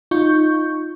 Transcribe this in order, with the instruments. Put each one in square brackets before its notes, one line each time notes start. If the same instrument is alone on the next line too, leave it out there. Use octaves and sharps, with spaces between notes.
[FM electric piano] D#4 F4 C#6 G6